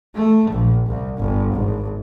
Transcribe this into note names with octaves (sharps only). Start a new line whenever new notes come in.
A3
A#1
C2
G1
G#1